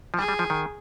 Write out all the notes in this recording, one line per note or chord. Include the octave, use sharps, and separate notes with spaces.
F3
G3 G#4
G3
F3
D#3